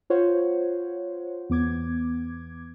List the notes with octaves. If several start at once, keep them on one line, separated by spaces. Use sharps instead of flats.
F4 C5 C#5 F#5
E2 B3 D6 G#6